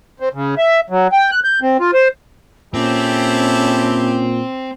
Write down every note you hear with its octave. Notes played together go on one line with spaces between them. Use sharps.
C4
C#3
E5
F#3
G5
F#6
G6
C4
F4
C5
A#2 C4 C#4 E4 G4 A4